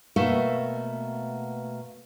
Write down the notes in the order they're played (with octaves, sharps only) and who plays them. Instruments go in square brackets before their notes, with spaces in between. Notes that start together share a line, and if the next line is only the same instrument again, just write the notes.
[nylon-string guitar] B2 A3 A#3 E5